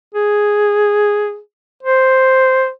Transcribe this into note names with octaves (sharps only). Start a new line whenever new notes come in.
G#4
C5